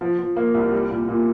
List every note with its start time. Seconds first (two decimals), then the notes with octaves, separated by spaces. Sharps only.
0.01 F3
0.18 F3
0.36 A#3
0.54 C2
0.72 G3
0.90 A#2
1.08 A#2